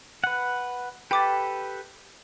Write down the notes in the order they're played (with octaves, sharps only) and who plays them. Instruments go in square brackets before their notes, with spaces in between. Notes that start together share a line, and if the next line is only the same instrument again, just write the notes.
[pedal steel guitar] B4 F#5
[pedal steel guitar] G4 A4 B4 [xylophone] G5 D6 A6